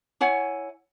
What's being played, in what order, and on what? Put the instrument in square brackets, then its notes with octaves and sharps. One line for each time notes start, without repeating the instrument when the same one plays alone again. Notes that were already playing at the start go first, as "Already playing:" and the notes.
[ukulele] E4 C#5 F#5 G#5